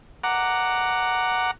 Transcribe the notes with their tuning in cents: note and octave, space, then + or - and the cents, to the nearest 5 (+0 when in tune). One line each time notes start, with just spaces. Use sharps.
F#5 +0 A#5 +0 D6 +0